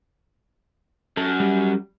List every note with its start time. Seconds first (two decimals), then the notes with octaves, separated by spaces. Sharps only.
1.17 F#2 A4
1.40 G3